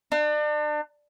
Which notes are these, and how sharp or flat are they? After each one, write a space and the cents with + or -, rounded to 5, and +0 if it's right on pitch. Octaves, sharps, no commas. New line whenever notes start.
D4 +35